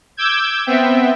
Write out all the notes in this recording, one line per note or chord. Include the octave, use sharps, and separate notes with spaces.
D6 E6 G6 G#6
B3 C4 E5 G5